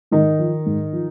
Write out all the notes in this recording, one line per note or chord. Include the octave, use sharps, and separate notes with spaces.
G#2 D#3 D#4
F3
G#2
F3